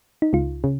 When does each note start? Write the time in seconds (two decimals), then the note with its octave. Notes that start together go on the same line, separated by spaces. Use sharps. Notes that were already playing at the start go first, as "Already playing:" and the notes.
0.22 D#4
0.33 C#2 F4
0.64 C#3